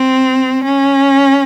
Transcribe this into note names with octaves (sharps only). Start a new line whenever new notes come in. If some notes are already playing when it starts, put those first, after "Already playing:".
Already playing: C4
C#4